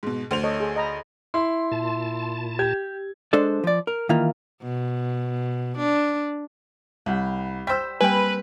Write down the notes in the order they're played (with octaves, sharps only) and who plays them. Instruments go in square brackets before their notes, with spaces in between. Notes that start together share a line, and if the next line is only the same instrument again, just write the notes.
[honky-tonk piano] G#2 B2
D2 C5 F7
[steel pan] A4 C#5 D#5
G#4
D#5 A#5 B5
[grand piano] E4 [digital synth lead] C6
[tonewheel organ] A#2 A5
[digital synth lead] G4 [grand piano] G#6
[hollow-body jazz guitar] G#3 D4 A4 C5 D5
F3 D5
A#4
D#3 E3 A#3 F4
[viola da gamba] B2
D4
[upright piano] C2 [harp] F#5 G5 B5
[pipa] G3 C5 [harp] G5 [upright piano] E6 B6
[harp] G3 A#3 C4 [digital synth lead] B4 [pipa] G5 G#5